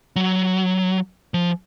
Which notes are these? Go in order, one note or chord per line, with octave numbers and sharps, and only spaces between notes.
F#3
F3